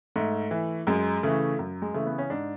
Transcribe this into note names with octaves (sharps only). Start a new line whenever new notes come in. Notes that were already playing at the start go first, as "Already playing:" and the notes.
G#2 A3
E3
F#2 G#3
C#3 E3 A3
F#2
G#3
C#3 E3 A3
B3
C#4
G#2 D4